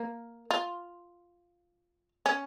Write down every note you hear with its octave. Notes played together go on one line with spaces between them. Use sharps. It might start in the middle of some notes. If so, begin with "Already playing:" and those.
Already playing: A#3
F4
C#4